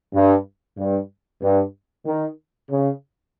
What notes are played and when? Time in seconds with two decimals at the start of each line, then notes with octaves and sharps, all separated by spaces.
0.13 G2
0.77 G2
1.40 G2
2.05 D#3
2.68 C#3